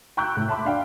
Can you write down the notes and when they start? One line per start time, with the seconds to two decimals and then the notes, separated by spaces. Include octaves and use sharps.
0.17 G5 A#5 C#6 E6 F#6 G6
0.35 A2 F#6
0.48 E5 A5 B5 C6 D6
0.65 D4 F5 G5